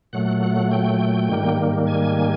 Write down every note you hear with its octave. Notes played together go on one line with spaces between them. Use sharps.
A#2 F#3 A3 F#5
F#5
G5
G#2 D#3 G3 A#3
G#5